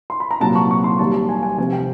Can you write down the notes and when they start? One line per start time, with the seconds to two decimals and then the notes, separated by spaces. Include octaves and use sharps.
0.10 C6
0.20 B5
0.31 A#5
0.40 C2 A#2 F#3 A5
0.55 C#6
0.71 C#6
0.84 C6
0.99 D#2 D#3 G3 A5
1.14 A5
1.29 G#5
1.43 G#5
1.57 F1 F2 C3 G#5
1.73 G5